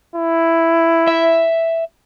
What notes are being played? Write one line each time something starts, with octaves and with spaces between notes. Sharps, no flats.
E4
E5